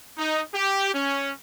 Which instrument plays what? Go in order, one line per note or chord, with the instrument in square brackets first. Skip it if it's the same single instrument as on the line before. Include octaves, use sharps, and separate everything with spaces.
[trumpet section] D#4
G4
C#4